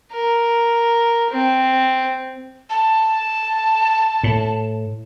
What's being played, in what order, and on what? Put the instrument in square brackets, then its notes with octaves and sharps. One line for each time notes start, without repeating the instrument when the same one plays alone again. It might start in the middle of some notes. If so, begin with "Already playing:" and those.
[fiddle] A#4
C4
[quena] A5
[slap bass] A2